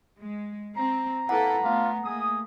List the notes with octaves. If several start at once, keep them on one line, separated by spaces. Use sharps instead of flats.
G#3
C4 A#5
A#3 E4 A4 B4 F#5
A3 B3 D4 F4 F5
A3 A#3 G#4 D#6